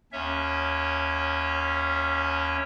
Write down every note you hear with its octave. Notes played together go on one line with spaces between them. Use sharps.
D#2 C#4 C#5 E5